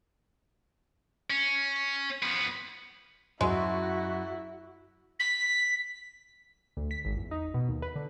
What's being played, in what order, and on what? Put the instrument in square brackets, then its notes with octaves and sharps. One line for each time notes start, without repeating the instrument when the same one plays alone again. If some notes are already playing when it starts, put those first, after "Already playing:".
[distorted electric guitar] C#4
F3 B3
[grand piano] F#2 [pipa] G#3 [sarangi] E4 [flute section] F#4
[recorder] B6
[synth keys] D2
B6
G#1
E2
D#4
B2
D#2
B4
D3